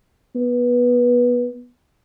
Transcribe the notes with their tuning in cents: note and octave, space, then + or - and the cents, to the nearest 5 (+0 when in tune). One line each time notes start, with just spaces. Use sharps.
B3 -20